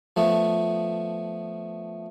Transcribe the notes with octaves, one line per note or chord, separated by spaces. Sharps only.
F3 A3 B3